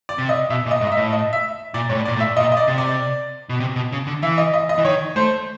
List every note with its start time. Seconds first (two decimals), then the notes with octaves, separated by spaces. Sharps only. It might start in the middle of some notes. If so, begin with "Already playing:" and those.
0.09 D5
0.18 C3
0.29 D#5
0.50 B2 E5
0.66 A#2
0.71 D#5
0.81 G#2
0.87 D#5
0.92 E5
0.97 A2
1.12 D#5
1.33 E5
1.74 A#2 D5
1.89 G#2 C#5
1.95 A2
2.05 D5
2.08 A#2
2.16 A2
2.20 E5
2.37 A#2 D#5
2.52 D#5
2.57 D5
2.67 C3
2.78 D5
3.49 B2
3.60 C3
3.76 B2
3.92 C#3
4.07 D3
4.22 E3 E5
4.38 D#5
4.54 D#5
4.69 D#5
4.78 E3
4.85 D#3 C#5
5.16 A3 C5